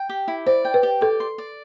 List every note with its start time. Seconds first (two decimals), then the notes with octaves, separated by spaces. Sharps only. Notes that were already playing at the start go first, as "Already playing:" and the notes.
Already playing: G5
0.09 G4
0.28 E4
0.46 C5 D5
0.65 G5
0.74 B4
0.83 G4
1.01 A4 D5
1.20 C6
1.38 D5